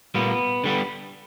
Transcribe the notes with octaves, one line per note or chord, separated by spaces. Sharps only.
A#2 G3 A#3 B3
D3 G3 B3